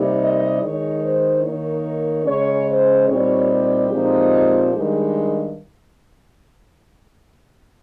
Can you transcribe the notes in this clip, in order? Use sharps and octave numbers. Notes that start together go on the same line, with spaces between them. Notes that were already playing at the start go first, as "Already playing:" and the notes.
Already playing: C3 G3 A#3 D#4
D#5
D#3 G#3 D#4 C#5
C5
D#3 A#3 D#4 C#5
C#3 G#3 C#4 C#5
C5
A#2 G3 C4 D#4 C#5
G4
A#2 F3 G#3 C4 D#4
G2 D#3 G#3 D#4